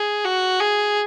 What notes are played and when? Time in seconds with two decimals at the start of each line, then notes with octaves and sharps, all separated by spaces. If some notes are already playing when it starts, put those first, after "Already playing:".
Already playing: G#4
0.25 F#4
0.60 G#4